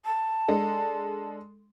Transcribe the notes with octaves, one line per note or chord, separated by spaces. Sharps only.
A5
G#3 D4 A4